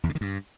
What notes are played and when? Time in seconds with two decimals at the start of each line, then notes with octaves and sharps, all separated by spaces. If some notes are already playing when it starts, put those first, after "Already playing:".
0.04 E2
0.09 C#3
0.15 D#3
0.21 G2